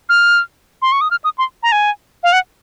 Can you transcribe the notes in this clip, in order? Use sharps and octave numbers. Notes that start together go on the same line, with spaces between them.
F6
C6
C#6
D#6
F6
D#6
C6
A#5
G#5
F5
F#5